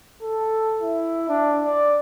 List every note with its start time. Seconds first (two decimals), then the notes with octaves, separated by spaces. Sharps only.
0.22 A4
0.82 E4
1.29 D4
1.65 D5